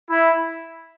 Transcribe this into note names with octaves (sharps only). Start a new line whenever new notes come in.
E4